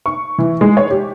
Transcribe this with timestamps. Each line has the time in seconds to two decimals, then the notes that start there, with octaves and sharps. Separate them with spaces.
0.06 C#6
0.38 E3
0.61 G#3
0.77 C#5
0.91 G4